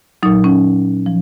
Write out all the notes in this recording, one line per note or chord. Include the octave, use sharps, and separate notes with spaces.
A#2 F#3 D#4
C#4
F3